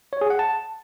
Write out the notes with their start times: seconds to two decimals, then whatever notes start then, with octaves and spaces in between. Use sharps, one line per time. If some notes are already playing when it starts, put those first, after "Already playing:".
0.13 C#5
0.21 G#4
0.30 F#5
0.39 A5